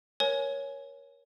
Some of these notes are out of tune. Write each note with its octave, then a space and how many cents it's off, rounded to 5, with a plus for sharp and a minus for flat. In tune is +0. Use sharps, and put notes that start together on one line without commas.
A#4 +30 C#5 +0 G#5 +20